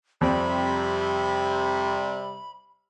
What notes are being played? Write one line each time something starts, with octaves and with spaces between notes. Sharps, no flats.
F2 C3 G3 C4 B5